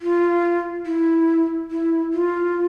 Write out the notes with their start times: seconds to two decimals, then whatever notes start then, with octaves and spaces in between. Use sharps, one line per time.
0.02 F4
0.86 E4
1.71 E4
2.13 F4